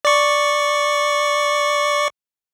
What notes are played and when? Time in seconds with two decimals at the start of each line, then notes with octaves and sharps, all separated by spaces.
0.05 D5 C#6